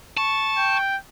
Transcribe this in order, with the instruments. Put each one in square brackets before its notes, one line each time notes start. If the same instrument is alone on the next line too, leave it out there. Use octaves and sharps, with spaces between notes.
[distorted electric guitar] A5 [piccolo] C#6
[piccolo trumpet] G5